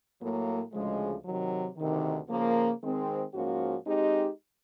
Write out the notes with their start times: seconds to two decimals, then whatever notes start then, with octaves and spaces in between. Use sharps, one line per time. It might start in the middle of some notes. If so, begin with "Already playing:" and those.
0.20 A2 F#3 A#3
0.72 D2 C#3 F3 G#3
1.25 C3 D#3 F#3
1.76 D2 C3 D#3
2.29 C#3 F3 A#3
2.81 D#3 G#3 C4
3.33 G#2 F3 A#3 C#4 F#4
3.86 G#3 C4 D#4 G4